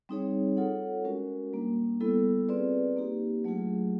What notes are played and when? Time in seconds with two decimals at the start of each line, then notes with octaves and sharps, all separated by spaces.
0.09 G3 C4 D#4 G#4 C#5
0.57 F4 A4 C#5 F#5
1.05 G#3 C#4 F#4 A#4
1.53 G3 A#3 D4
2.01 G3 B3 E4 A4
2.49 C4 F4 G#4 B4 D5
2.97 A#3 D#4 G4
3.44 F#3 A3 D4 F4 G#4